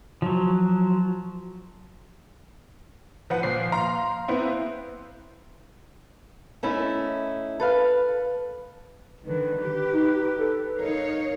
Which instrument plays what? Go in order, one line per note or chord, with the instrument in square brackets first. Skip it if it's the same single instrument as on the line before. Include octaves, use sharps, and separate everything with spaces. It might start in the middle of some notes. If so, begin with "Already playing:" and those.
[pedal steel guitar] F3 F#3
[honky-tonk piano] F3 B4 F#5
[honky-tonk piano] A#2 F3 [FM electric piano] C7
[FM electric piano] F5 C6 [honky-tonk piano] A#5
[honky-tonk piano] B3 C4 E4
[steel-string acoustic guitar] A3 C#4 D#4 E4
A4 B4 F5
[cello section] D3 D#3 [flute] B4
[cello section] G4
[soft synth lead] D#4
A4
[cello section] D#4 C#5 F5 [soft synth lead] A#4